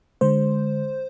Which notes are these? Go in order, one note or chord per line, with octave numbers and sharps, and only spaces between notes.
D3 G#3 C5